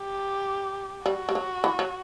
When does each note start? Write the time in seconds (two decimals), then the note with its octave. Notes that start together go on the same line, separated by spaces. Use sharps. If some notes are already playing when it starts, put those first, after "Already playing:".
Already playing: G4
1.06 G3 F#4
1.29 G3
1.35 F#3
1.64 E3
1.79 F#3